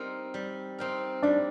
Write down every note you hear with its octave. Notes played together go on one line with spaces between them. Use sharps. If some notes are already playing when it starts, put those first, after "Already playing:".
Already playing: G3 C4 D#4 A#4
G3
C4 D#4 A#4
G3 D4